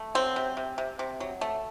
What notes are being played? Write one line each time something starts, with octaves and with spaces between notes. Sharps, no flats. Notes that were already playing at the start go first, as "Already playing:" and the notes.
Already playing: A3
F#3 C4
C3
C3
C3
C3
F#3
A3